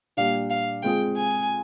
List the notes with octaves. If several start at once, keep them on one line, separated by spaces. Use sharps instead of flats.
A#2 G3 D4 G4 F5
F5
G#3 C4 F4 G#4 G5
G#5